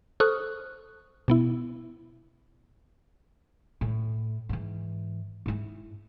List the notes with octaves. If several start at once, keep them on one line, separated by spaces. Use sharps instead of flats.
A4 C5 C#6 D#6 F6 F#6
B2 B3 E4
A2
G#2 E3
G#2 E4